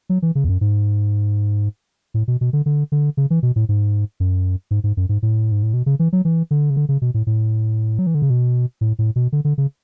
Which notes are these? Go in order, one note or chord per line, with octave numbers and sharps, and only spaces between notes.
F#3
E3
C#3
E2
F#2
G#2
A2
B2
B2
D3
D3
D3
C#3
E3
B2
A2
G#2
F#2
G#2
G#2
F#2
G#2
A2
G#2
A2
B2
C#3
E3
F#3
E3
D3
C#3
D3
C#3
B2
A2
A2
F#3
E3
D3
C#3
B2
A2
A2
B2
D3
D3
C#3